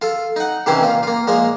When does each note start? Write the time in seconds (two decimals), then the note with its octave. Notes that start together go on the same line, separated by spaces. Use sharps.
0.02 F4 A4
0.36 D#4 F#5
0.66 C3 D#3 E3 C#4 E4 C5
0.82 A#2 F4
1.03 A#3 F4
1.27 A#2 F3 G#3 A#3